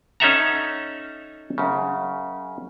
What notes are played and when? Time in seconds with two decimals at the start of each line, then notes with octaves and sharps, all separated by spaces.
0.20 C#4 D#4 A4 E5 F#5 A#5
1.58 F#2 C#3